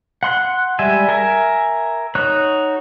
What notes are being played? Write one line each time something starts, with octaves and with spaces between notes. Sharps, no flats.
F#5 C6 F#6
G3 G#3 E5 G#5
A#4 E5 G#5
D#4 F#4 C#5 F#6